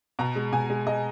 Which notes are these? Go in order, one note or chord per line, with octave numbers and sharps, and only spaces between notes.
B2 A#5
G#3
B2 G#5
G#3
G#3 D#5